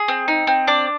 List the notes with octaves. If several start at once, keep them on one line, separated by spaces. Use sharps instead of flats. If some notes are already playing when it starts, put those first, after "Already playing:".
Already playing: G#4
C4
D#4
C4
D4 D5